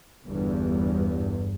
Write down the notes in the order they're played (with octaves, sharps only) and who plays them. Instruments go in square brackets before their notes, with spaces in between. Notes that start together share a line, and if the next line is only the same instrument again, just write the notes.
[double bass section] G1 E2 G2